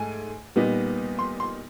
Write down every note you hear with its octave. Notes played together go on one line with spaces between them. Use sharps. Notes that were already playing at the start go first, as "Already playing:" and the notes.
Already playing: G#2 A3 G#5
A#2 G3 B3 D#4
C6
C6